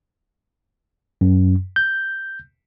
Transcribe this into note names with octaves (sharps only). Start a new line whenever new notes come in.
F#2
G6